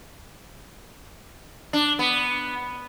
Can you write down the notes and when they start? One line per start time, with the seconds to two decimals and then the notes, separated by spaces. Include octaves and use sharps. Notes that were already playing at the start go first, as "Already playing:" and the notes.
1.73 D4
1.99 B3